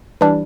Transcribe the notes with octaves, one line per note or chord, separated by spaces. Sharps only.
E3 G3 D4